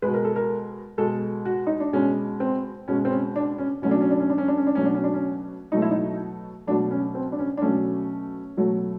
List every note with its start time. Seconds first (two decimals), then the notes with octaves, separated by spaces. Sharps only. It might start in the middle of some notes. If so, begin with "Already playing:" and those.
0.02 B2 G#3 B4
0.14 A#4
0.25 A4
0.36 A#4
0.98 B2 G#3 A4
1.45 F#4
1.67 D#4
1.80 D4
1.92 B2 G#3 C#4
2.40 C4
2.88 B2 G#3 C#4
3.05 C4
3.11 C#4
3.36 D4
3.58 C#4
3.82 B2 F#3 A3 C#4
3.91 D4
4.01 C#4
4.11 D4
4.20 C#4
4.30 D4
4.38 C#4
4.48 D4
4.57 C#4
4.67 D4
4.75 B2 F#3 A3 C#4
4.86 D4
4.95 C#4
5.04 D4
5.14 C#4
5.72 B2 F#3 A3 D#4
5.82 E4
5.91 D#4
6.67 B2 F#3 A3 D4
6.91 C#4
7.15 C4
7.32 D4
7.39 C#4
7.57 D4
7.62 B2 F#3 A3 C#4
8.57 B2 F#3 A3